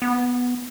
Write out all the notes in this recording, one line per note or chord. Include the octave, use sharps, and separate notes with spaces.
B3